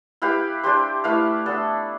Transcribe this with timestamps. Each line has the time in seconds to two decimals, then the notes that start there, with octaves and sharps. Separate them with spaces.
0.22 E4 G4 B4 F5
0.64 D4 G4 C5
1.04 A3 E4 B4 F5
1.46 B3 D4 A4